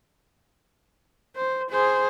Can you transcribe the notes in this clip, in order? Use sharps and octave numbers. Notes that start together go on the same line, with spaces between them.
C5
G#4 C5